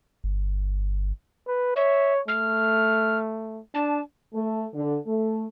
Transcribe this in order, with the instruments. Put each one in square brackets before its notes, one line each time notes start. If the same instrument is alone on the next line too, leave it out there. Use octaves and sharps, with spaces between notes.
[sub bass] G1
[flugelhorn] B4
[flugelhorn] C#5 [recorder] E5
[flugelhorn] A3 [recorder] F6
[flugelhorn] D4 [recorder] A5
[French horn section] A3
D3
A3